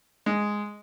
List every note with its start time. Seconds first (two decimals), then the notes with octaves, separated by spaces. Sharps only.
0.26 G#3